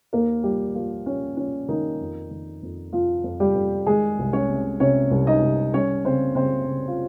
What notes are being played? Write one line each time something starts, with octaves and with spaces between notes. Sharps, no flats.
D#2 A#3 A#4
F3 G3 G4
F3 A#3 F4
F3 C#4
F3 C#4
D#3 A#3 D#4
F2
D#3
F2
F2 F3 F4
F2
G3 G4
F2
D#3 G#3 G#4
C2
C#4 C#5
C3
C3 C#4 C#5
C2
D#4 D#5
C2
G3 C#4 C#5
C#3 C4 C5
C#3 C4 C5
C#3
F4